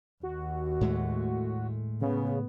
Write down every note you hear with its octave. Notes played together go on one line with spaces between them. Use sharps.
D#2 F#4
A2 G#3 A3
C#3 B3